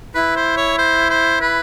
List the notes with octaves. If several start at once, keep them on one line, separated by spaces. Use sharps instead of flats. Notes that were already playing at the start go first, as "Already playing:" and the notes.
E4 B4
C5
C#5
C5
C5
B4